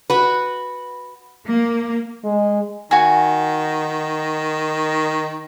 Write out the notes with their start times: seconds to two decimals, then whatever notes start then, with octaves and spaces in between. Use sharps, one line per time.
0.10 F#4 B4
1.45 A#3
2.24 G#3
2.91 D#3 F#4 G#5